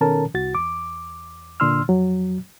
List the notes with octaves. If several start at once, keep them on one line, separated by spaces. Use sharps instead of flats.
B2 D#3 C#4 A4 A#4 A5
C2 F#4 A6
E2 D6
A#2 D3 D4 C6 E6 F6
F2 F#3